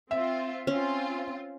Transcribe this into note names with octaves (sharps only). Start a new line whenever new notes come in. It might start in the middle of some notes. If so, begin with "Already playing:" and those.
C4 F4 E5
C4 C#4 F4